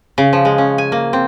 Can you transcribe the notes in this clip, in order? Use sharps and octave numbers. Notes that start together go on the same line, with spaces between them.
C#3
F3
G#3
C#4
G#5
A#3
C4